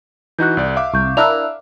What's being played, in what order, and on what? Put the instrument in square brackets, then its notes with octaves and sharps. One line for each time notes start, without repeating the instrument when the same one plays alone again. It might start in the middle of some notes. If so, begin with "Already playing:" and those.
[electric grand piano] E3 D#4 F#4 [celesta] F#6 G6
[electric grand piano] C2 D5
E5 F5 D6
[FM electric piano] C2 [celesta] C#6 G6
[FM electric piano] D4 E4 A#4 [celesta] E6 F#6 F7